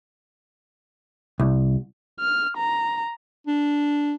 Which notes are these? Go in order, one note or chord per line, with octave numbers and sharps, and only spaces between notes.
C2
F6
A#5
D4